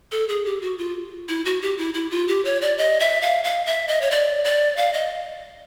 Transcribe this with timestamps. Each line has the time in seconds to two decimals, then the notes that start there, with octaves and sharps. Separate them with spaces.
0.12 A4
0.28 G#4
0.45 G4
0.62 F#4
0.78 F4
1.29 E4
1.45 F#4
1.62 G4
1.78 E4
1.94 E4
2.11 F4
2.28 G4
2.45 C#5
2.62 D5
2.78 D#5
3.00 E5
3.22 F5
3.44 F5
3.66 E5
3.88 D#5
4.01 C#5
4.11 D5
4.44 D5
4.77 F5
4.93 D#5